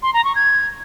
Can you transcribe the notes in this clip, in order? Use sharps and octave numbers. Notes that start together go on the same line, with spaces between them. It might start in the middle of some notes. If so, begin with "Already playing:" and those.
C6
A#5
C#6
G#6